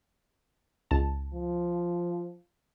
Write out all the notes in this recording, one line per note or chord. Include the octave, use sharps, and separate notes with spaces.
C#2 A5
F3